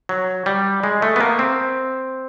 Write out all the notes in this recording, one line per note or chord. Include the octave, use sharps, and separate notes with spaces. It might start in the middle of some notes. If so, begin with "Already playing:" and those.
F#3
G3
G#3
A3
B3
A#3
C4